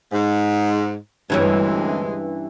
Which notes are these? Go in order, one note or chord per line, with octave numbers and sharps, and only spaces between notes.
G#2
D2 G2 C3 E3 G#3 C#4